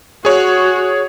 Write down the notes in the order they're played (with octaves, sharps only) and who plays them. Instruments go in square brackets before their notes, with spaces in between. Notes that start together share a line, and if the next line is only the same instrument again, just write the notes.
[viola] F#4 [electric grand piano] G#4 C#5